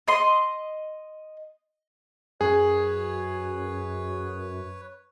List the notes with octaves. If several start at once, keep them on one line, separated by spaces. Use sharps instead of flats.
D#5 C6
F#2 G#4 B4 C#5